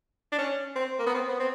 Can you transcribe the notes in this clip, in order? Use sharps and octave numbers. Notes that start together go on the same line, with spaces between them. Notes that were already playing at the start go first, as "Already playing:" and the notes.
D4
C#4
C4
A#3
B3
C4
B3
C4